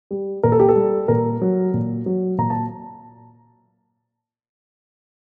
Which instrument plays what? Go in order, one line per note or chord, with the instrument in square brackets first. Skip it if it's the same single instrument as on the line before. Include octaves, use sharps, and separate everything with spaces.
[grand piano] G3
A#2 A#4
A4
G4
A4
G3
A#2 A#4
F#3
A#2
F#3
A#2 A#5
A5